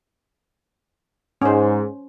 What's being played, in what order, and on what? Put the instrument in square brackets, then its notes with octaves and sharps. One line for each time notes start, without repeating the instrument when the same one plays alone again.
[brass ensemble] G#2 [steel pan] C#4 C5